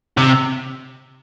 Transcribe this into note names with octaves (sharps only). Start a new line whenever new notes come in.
C3